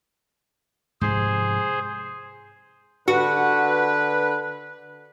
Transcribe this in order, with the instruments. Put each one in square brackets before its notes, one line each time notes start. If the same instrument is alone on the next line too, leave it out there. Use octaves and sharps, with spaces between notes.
[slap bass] G#2 C3 F3 [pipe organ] G#4 C5
[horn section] D3 B4 [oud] F#4